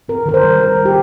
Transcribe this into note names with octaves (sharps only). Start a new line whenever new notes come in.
C4 A#4
D#3 A#4
C5
G3
D#3 A#4
D#3
G4